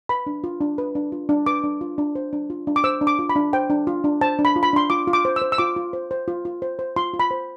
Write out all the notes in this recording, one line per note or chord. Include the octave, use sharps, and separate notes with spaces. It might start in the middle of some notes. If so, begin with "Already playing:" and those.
B4 B5
D4
F4
D4
B4
D4
F4
D4
B4 D6
D4
F4
D4
C5
D4
F4
D4
D6
C5 E6
D4
D6
F4
B5
D4
C5 G5
D4
F4
D4
C5 A5
D4
B5
F4
B5
D4 C6
F4 D6
F4
D6
C5
E6
C5
E6
F4 D6
F4
C5
C5
F4
F4
C5
C5
F4 C6
F4
B5
C5